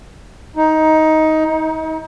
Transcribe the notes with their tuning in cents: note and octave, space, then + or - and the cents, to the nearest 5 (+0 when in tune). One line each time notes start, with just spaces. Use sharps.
D#4 +15
D#4 +35